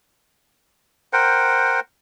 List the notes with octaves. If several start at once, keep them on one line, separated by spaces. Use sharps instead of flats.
A#4 C5 F#5 G5